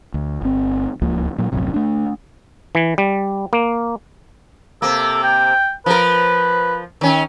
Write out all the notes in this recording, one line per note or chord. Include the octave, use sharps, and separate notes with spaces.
D2
G1 C4
D1 C#2 F3 A#3
A#2 F#3
D1 A#1 F#2 C3
A3 D4
E3
G3
A#3
C3 A#3 A4
G5
F3 A#4 B4
D#3 C#4